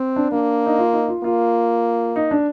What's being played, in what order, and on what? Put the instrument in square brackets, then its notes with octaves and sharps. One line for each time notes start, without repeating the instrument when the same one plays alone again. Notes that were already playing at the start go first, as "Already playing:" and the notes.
Already playing: [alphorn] C4
[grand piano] D4
[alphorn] A#3 [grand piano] D4
[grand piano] D#4
F4
D#4
F4
[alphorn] A#3 [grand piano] F4
[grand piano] D#4
D4